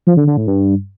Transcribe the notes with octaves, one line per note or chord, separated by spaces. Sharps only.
F3
D3
D3
A2
G2